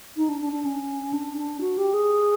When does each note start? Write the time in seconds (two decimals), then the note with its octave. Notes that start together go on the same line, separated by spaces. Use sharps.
0.17 D#4
0.29 D4
0.41 D4
0.52 D4
0.65 C#4
1.13 D4
1.37 D4
1.61 F#4
1.78 G4
1.94 G#4